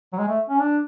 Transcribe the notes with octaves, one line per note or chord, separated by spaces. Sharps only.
F#3
G#3
A3
C#4
D4